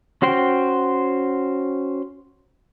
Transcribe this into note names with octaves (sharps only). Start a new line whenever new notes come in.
C#4 F#4 C5 G5